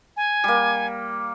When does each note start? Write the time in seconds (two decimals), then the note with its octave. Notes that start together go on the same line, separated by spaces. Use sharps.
0.17 G#5
0.44 G3 A#3